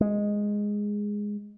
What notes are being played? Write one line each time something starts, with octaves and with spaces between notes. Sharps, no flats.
G#3